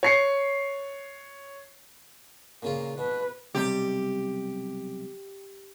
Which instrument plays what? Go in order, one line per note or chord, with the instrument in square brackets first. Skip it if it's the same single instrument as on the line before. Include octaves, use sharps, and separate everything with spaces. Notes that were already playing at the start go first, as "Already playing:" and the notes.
[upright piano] C#5 C7 C#7
[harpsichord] A#2 C#3 F4 [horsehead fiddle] A#3
[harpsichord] B2 [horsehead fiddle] B4
[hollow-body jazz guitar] B1 C3 G3 [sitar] G4